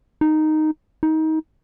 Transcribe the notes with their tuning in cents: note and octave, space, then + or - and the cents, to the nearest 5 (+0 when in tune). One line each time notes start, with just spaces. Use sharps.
D#4 -5
D#4 +25